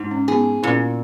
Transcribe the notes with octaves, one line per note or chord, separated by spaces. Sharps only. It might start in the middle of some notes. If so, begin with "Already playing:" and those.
Already playing: G#2
C#4
B3 D#4 G#4
A#2 C#4 E4